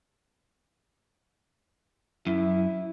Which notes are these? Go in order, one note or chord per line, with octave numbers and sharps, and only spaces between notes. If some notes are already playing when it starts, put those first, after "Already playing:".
F#2 E4